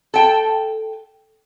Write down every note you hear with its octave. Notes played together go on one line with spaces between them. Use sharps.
A4 G5